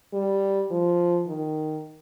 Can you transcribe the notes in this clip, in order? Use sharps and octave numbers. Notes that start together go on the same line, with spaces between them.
G3
F3
D#3